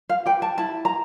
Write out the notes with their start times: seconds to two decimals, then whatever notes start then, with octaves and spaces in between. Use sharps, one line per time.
0.09 F5
0.26 G4 B4 G5
0.42 A5
0.58 E4 A5
0.85 A#5